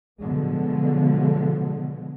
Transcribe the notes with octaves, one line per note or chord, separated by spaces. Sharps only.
B2 D3 F3 F#3 G#3 B3